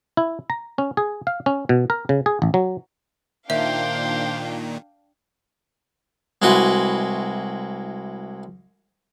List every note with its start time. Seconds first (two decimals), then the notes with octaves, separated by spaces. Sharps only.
0.17 E4
0.50 A#5
0.78 C#4
0.97 G#4
1.27 F5
1.46 C#4
1.69 B2
1.90 A#4
2.09 C#3
2.26 G#4
2.42 A1
2.54 F#3
3.50 A#2 D#3 D4 C5 E5 F5 G5
6.42 C2 G#3 E4 F#4 B4 C6